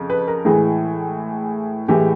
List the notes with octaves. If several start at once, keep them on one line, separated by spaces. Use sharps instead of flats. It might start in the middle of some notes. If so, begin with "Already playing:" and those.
Already playing: F2 C#3
B4
A#4
A2 E3 G#3 G#4
A2 E3 G#3 G4